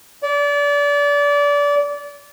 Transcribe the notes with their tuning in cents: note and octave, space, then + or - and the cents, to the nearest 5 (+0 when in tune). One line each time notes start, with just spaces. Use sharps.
D5 -30